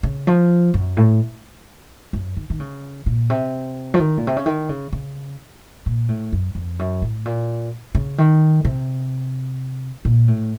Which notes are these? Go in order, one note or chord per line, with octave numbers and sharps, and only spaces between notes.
C#3
F3
F#2
A2
F#2
D#3
D#3
C#3
A#2
C3
F3
D#3
A#2
C3
C#3
D#3
C#3
C#3
A#2
A2
F#2
F2
F#2
A2
A#2
C#3
D#3
C3
A#2
A2